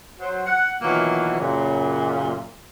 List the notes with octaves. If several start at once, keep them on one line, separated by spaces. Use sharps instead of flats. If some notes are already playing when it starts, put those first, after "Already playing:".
F#3 C5
F#5
B2 D#3 E3 F#3 A#3 F4
F#2 A#2 C#3